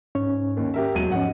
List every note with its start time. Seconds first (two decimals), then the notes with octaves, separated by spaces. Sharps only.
0.15 G#2 C#4 C#5
0.57 D#2 D#3
0.74 G4 A#4 E5
0.95 E1 D#2 F#3 D#7
1.12 G#2 F3 C#4 D#5 F#5